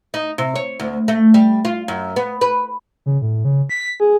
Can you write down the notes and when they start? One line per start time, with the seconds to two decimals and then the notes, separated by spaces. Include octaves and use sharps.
0.14 D#4
0.38 C3
0.56 C#5
0.80 D2
1.08 A3
1.34 G3
1.65 F4
1.88 F#2
2.16 B3
2.41 B4
3.06 C#3
3.22 A2
3.45 C#3
3.69 B6
4.00 G#4